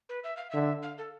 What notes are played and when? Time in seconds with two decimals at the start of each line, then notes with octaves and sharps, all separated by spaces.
0.09 B4
0.24 E5
0.37 F5
0.51 D3 E5
0.83 F5
0.98 A4